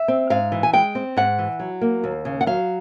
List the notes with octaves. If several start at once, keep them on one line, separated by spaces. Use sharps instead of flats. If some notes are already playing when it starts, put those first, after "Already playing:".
Already playing: E5
C4
G#2 F5
E3
G#5
G#3 G5
C4
G#2 F#5
E3
F#3
A#3
D#2
C#3
F#5
F#3 F5